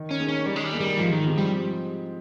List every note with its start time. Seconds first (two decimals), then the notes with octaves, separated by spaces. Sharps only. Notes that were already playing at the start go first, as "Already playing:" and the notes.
Already playing: D#3
0.11 C#4
0.19 A#3 D#4 G#4
0.29 C#4
0.46 D#3 G3
0.56 G#3
0.64 G3
0.72 A#3 D#4 G#4
0.80 G3
0.98 G#2 F3
1.11 D#3
1.25 F3 G#3 C4 G4
1.37 G3